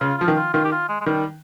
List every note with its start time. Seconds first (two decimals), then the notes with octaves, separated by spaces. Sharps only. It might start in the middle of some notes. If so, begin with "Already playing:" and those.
0.01 C#3 F4
0.19 F3 F4
0.28 D#3
0.37 F4
0.54 D#3 F4
0.65 G4
0.72 F4
0.89 G#3
1.01 G#3
1.06 D#3 G3